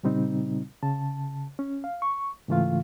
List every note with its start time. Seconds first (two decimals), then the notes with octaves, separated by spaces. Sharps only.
0.03 A#2 C#3 G3 C4 D#4
0.83 C#3 A5
1.59 C#4
1.84 F5
2.02 C#6
2.48 G#2 C#3 E3 A3 F4 F5